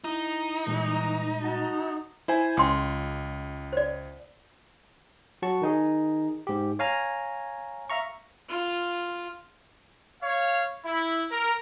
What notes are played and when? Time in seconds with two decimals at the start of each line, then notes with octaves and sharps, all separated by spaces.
0.04 D#4 E4
0.67 A#2 E3 G3 G#3 A#5
1.42 F#4 A5 A#5
2.28 E4 C5 G#5
2.57 C#2 G5 C6 D#6
3.73 C5 D5
5.42 F#3 F#4 A5 C#6
5.62 D#3 D#4 G#4
6.47 G#2 G4
6.79 C#5 F5 G#5 A#5
7.90 E5 F5 A#5 C#6
8.49 F4
10.23 C#5 F5
10.86 E4
11.32 A#4